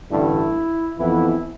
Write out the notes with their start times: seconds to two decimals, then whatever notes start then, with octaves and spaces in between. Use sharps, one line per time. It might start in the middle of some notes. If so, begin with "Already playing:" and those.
0.11 A1 G2 D3 A3 E4
0.98 F2 E3 B3 E4